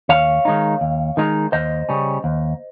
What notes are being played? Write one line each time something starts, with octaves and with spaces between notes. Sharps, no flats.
D#2 C#5 F5
D#3 G#3 D#4
D#2
D#3 G#3 D#4
D#2 C5 D#5
C#3 G3 C#4
D#2